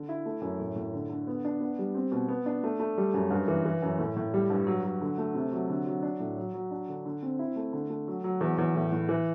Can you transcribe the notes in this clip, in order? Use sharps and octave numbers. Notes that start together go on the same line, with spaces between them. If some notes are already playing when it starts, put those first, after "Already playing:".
Already playing: D3
E4
A3
F#2
A2
A2
D3
D3
B3
D4
B3
G3
C4
B2
B3
D4
A3
A3
G3
F#2
G2
E3
E3
F#2
A2
A2
G3
G2
F#3
F#3
D3
A3
C3
F#3
D3
F#3
D4
A2
F#3
F#3
D4
D3
D3
C4
E4
A3
D3
A3
F#3
F#3
E2
E2
A2
A2
E3